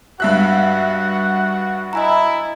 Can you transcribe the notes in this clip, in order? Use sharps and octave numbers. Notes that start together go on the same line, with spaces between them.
G2 F#4 E5 F#5 F#6
E4 D#5 G#5 A#5